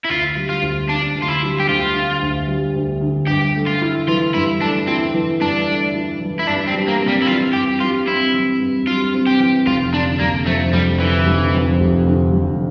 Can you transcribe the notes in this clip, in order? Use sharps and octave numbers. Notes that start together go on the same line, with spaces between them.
E4
D2 F4
G3
F4
D2
D3 D4
D2
F4
E4
G3
G4
D2 F4
D3
D2
G3
D2
D3
G2 G4
A3
F4
E4
E3 F4
G2 E4
A3 D4
C4 E4
E3
G2 D4
A3
E4
E3
E4
G2 D4
C4
G3
A#3
C4
G3
E4
E3 F4
G2 G4
G3 F4
C4 E4
E3
G2
G3 F4
C4
G4
E3
F1 F4
D3 D4
F1 A#3
F2 A3
F1 G3
D3 E3
F1
F2
F1
D3
F1